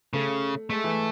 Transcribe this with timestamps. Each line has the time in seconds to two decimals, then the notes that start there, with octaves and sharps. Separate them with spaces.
0.14 C#3 A3
0.70 G#3 A3
0.84 E3